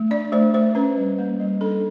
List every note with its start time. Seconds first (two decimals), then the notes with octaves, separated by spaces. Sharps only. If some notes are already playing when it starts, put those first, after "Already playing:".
Already playing: A3
0.11 D4 D5
0.32 A3 C5
0.54 A3 C5
0.75 C#4 B4
0.97 G3
1.18 A#3
1.40 G3
1.61 D4 A4